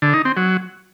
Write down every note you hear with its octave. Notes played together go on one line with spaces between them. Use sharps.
D3
D#4
C4
F#3